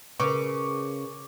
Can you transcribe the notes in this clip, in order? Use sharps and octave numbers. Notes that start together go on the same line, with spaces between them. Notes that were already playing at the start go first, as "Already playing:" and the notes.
C#3 A#4 B4 C#6 D6